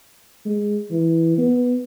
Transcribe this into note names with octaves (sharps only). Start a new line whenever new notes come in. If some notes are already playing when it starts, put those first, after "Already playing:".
G#3
E3
B3